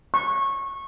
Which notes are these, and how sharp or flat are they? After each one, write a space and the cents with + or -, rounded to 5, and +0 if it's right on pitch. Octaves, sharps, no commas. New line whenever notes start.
C#6 -20